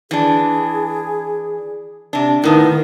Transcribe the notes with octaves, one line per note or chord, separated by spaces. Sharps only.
E3 D4 G#4
C3 D4
A2 D#3 B3 A#4